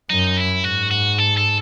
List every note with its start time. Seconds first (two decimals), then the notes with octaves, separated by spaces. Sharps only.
0.10 F#2 D#4
0.37 E4
0.64 G#2 F#4
0.91 F#4
1.18 A4
1.37 A4